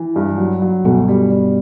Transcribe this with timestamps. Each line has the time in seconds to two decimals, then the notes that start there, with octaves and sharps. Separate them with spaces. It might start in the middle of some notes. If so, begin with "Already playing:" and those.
Already playing: E3
0.16 G2
0.38 F#3
0.62 F#3
0.85 D2 G2 B2
1.08 G3
1.30 G3